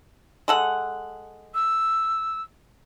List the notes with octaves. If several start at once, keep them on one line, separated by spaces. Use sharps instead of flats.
G#3 A4 F#5
E6